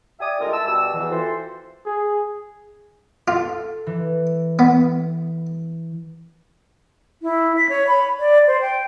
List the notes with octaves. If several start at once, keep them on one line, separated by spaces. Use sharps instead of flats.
D5 E5 G5 G#5 D#6
C2 D3 G#3 F4 A#4
E5 A5 E6
B2 G3 G4 E6
E2 E3
E3 C4 F4 F#4 A4 C5
G#4
F4 A4
E3
B3
E4
B6
C#5
B5
D5
C5
G5